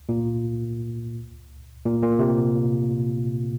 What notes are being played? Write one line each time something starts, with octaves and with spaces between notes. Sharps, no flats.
A#2
A#2
A#2
C3